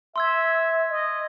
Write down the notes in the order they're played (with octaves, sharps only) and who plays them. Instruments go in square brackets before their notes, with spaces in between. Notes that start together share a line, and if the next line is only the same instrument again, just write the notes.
[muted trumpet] E5 [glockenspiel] C6 E6 G#6
[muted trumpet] D#5